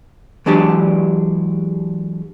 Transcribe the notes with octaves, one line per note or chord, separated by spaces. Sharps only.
E3 F#3 G#3 D4 G4 D5